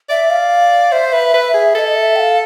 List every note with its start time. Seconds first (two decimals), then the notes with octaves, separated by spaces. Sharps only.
0.09 D5 E5
0.30 F5
0.92 C5 E5
1.13 B4
1.34 B4
1.54 G#4
1.75 A4 E5
1.79 D#5
1.95 E5
2.16 G5
2.20 F5